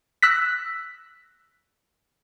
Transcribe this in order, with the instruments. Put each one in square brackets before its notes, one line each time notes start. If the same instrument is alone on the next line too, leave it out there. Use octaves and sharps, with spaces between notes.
[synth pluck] E6 F#6 A#6 B6